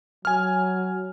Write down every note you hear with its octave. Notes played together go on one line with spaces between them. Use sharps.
F#3 G#5 F6